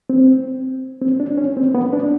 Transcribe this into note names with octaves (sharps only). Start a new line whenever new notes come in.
C4
C4
D4
C#4
C4
B3
D4